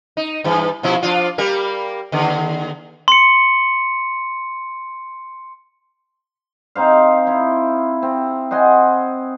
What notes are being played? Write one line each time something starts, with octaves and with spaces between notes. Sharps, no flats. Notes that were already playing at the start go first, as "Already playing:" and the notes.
D#4
G2 E3
B2 F3 E4
F3 D4 F4
G3 A#3 A#4
D#2 D3
C6 C#7
C4 D#4 C5 F5
E4 C5
C4
C5 D#5 F#5 G#5